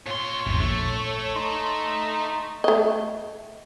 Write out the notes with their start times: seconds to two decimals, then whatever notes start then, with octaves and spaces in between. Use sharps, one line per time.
0.06 A#2 C#5 C6
0.46 G#1 E2 C3
0.60 A#1 A3
1.35 D#4 C6
2.64 A3 D#5